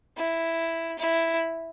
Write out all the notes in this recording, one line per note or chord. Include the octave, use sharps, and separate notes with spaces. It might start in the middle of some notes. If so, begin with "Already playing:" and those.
E4
E4